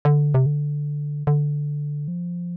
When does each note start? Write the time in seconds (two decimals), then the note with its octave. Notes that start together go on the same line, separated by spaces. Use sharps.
0.05 D3
0.34 C3
0.46 D3
1.27 D3
2.08 F3